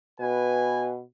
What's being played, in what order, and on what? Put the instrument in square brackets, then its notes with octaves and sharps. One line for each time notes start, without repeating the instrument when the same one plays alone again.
[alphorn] B2 [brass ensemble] B4 G#5